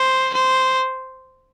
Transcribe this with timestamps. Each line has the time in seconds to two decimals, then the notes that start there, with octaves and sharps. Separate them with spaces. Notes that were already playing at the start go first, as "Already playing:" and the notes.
Already playing: C5
0.34 C5